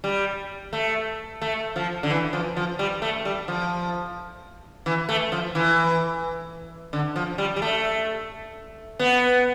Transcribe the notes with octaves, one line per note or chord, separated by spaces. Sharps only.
G3
A3
A3
F3
D3
E3
F3
F3
G3
A3
G3
F3
E3
A3
F3
E3
D3
F3
G3
G3
A3
B3